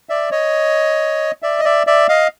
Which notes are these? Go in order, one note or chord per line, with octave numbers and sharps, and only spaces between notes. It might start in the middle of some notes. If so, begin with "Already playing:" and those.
D5 E5
C#5 D#5
D5 E5
D#5
D5 E5
D5 E5
D#5 F5